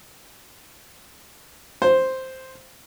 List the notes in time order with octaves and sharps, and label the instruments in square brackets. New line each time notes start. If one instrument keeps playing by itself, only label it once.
[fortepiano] C5